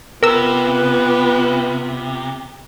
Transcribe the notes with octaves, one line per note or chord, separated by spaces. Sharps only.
C3 B3 F4 A#4 B4 E6